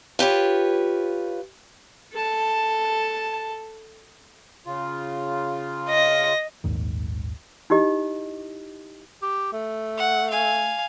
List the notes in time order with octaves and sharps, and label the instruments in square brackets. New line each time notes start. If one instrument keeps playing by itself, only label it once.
[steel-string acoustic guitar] F4 G4 B4 C#5
[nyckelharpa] A4 A5
[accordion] C#3 F4
[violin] D#5 A#6
[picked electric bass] A#1 D#2 G#2 D#3
[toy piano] D#4 E4 G4 D#5
[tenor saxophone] G4
A3
[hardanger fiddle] F#5
F5 G#5